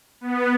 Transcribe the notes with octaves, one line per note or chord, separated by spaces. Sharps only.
B3